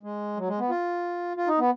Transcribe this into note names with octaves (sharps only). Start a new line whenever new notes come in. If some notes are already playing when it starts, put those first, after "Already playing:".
G#3
F#3
G#3
B3
F4
F4
D#4
B3